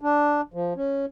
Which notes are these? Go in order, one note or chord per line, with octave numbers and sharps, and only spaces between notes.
D4
F3
C#4